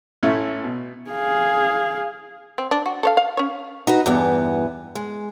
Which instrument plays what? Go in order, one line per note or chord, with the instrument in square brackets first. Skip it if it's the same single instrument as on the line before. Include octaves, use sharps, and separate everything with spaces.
[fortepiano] A1 A3 C#4 E4
B2
[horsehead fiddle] G#4 F5
[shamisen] C4
D4
F#4
A4 C#5 F5
F5
C#4 C#5
[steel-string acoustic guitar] D#4 F#4 B4
E2 G2 E3 B3
G#3